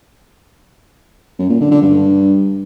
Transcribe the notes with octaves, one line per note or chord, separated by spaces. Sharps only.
F#2
A#2
D3
D3
G2